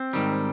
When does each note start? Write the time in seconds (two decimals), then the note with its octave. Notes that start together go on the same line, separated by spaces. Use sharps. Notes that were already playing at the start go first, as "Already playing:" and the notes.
Already playing: C4
0.13 G#2 D#3 G3